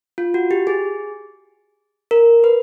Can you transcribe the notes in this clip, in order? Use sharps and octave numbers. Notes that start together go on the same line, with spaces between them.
F4
F#4
G4
G#4
A#4
B4